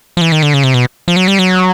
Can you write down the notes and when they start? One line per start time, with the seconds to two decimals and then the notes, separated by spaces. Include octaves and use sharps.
0.17 F3
0.21 E3
0.32 D#3
0.43 D3
0.54 C#3
0.64 C3
0.74 B2
1.08 F3
1.16 F#3
1.28 G3
1.39 F#3